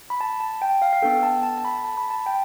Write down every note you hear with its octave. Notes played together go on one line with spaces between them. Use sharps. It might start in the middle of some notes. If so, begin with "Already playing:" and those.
B5
A5
A5
G5
F5
F5
B3 D4 A4 G5
A5
A5
A5
B5
A5
B5
A5
G5